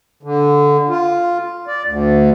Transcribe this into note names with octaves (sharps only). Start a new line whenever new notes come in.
D3
F4
D5
D2